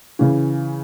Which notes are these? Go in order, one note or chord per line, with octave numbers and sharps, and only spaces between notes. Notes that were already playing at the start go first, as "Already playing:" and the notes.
C#3 E3